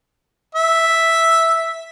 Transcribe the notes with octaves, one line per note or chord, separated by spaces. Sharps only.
E5